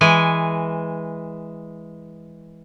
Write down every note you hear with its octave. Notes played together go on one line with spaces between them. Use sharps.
E3 G#3 G#5